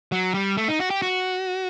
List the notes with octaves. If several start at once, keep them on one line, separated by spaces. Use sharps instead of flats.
F#3
G3
A3
D#4
F#4
G4
F#4